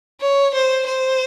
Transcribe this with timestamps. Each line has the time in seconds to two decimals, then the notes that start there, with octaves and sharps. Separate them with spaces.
0.21 C#5
0.55 C5
0.87 C5